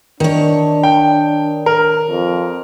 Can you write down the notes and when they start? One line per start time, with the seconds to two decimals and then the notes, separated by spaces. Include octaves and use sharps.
0.20 D#3 D4 C#5
0.83 G5
1.66 A#4
2.09 F2